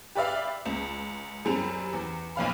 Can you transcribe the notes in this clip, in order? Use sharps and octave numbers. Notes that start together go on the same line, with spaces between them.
G4 B4 D5 E5 F5
C#2
F#2 G3 C4 F7
E2
B1 F2 F5 B5